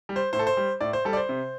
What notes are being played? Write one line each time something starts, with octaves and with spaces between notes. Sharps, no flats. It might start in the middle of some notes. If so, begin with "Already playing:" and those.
G3
C5
A2 C5
A4
C5
G3
A2 D5
C5
G3 A4
D5
C5
C3